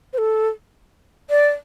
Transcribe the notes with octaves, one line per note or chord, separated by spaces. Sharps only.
C5
A4
D5